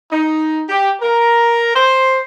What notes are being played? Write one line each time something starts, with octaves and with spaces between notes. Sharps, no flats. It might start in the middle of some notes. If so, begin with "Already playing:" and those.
D#4
G4
A#4
C5